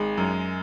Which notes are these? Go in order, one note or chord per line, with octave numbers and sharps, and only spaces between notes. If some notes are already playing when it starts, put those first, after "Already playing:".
Already playing: G#1 G#3
F#2